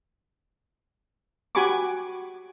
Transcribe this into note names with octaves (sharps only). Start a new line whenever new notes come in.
F#4 G4 G#5 B5 C#6 D6